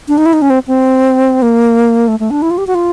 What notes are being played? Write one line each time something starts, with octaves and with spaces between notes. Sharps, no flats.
D4
D#4
E4
D#4
C#4
C4
C4
A#3
A3
A3
D4
E4
F4
G4
F#4
F4